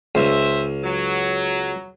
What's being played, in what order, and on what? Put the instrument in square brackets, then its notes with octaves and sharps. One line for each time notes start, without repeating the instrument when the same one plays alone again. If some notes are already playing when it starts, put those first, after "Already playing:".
[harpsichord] C#2 [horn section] C5 E5
[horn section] F#3